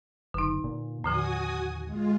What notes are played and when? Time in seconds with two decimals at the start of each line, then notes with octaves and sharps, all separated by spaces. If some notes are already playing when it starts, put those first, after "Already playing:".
0.34 F#1 D3 D#4
0.64 A#2
1.04 D#2 A2 D3 F3 F#4 G#5 D#6
1.86 G#3 F4